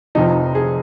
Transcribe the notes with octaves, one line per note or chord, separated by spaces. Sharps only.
F1 F2 C3 F3 D#4
G#4